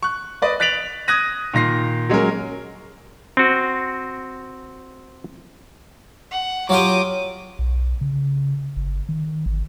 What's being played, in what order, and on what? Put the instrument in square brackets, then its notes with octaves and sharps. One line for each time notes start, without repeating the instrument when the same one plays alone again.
[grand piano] C#6 F#6
B4 D5 D#5
F#6 A6 B6 D7 F7 F#7
D#6 F#6 G#6 A#6 D#7
A#2 D#3 A#6 C7
F#3 G#3 C#4 A#4
[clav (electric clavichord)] C4 F#4
[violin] F#5
[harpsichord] F#3 F4 G4 [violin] D6 D#6
[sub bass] B1
C#3
G1
D#3
G#1